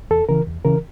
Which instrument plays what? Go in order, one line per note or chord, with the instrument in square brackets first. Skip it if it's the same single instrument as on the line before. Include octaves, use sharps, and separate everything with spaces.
[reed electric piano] E2 A4
C#3 E3 A#4
E2
C#3 E3 A#4